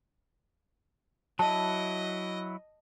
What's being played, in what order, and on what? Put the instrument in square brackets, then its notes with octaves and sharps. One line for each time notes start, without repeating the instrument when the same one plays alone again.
[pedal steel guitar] F#3 E4 [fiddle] D#5 [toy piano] A5